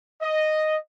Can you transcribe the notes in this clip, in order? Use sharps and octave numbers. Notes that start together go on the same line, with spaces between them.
D#5